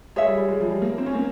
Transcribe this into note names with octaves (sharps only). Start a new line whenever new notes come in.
G#3 G#4 C#5 E5
G3
G3
G#3
F3
G3
A#3
C4
C#4
A#3